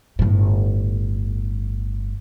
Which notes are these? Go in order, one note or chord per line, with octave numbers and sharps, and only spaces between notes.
G1 A2